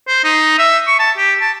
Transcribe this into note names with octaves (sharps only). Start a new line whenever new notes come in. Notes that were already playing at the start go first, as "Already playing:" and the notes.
C5
D#4
E5
C#6
A5
G4
A5